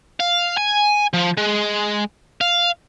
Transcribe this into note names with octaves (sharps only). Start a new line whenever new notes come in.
F5
G#5
F3
G#3
F5